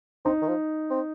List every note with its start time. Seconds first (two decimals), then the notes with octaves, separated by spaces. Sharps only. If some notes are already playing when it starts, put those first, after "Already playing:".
0.25 C4 D#4
0.42 D#3
0.48 F3
0.90 C4